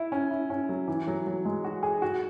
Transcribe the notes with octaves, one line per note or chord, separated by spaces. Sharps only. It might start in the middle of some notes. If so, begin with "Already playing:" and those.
Already playing: E4
C#4
E4
C#4
F#3
E3
F#3
F#3
G#3
F#4
G#4
F#4